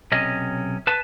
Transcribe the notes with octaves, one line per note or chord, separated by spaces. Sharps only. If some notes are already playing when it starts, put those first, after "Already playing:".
B1 C3 C#4 D#5
B4 A5